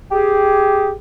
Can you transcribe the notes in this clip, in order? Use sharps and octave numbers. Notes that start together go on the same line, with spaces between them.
G4 G#4